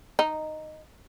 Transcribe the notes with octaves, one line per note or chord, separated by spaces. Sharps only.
D#4